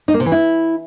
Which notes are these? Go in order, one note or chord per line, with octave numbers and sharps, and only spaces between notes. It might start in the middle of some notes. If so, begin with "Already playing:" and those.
D#4
A#3
C3
E3
E4